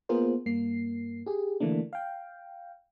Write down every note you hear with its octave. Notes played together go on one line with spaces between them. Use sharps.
A#3 B3 F4 G#4 A#4 C5
G2 A#3 C7
G4 G#4
D3 E3 A3 A#3 D4
F5 G5